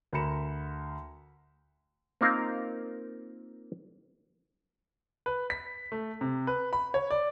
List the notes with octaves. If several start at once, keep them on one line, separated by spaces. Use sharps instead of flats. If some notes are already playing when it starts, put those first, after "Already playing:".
D2 A#4 A#5 B5 C#7 E7
A#3 C4 D#4 F4 A#4 F5
B4
B6
A3
C3
B4
B5
C#5
D5